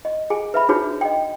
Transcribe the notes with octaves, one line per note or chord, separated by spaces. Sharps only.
D#5
G#4 G#5
B4 E5 B5
D4 D#4 F#4 G#4 B4 C#5
D#5 G5